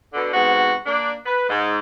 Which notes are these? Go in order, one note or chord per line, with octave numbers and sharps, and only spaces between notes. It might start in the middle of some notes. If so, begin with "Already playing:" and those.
B2 D3
G#2 C3 B3 F#4
A#3 D4
B4
G#2